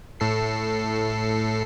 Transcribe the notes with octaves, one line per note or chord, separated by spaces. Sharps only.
A2 A4 C7